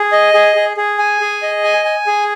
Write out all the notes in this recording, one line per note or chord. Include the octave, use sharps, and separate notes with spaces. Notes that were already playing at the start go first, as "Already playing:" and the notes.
Already playing: G#4
D#5
G#4
G#4
G#4
G#5
G#4
D#5
G#5
G#5
G#4